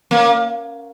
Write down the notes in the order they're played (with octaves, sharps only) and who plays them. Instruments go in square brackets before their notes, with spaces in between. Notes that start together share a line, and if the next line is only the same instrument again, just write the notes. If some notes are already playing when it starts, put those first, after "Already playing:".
[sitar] A#3